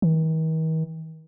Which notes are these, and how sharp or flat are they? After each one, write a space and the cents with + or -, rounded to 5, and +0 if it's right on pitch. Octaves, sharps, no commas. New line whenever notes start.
D#3 +45